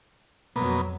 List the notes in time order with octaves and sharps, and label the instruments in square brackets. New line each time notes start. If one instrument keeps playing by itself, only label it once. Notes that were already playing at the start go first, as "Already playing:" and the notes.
[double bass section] F2 F#3 [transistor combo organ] B2 A#3 B3